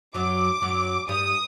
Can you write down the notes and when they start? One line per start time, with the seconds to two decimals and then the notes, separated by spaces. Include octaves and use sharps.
0.14 F#2 F#3 D6
0.62 F#2 F#3
1.09 G2 G3 D#6